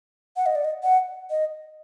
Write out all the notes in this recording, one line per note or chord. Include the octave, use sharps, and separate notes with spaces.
F#5
D#5
D5
D#5
F#5
D#5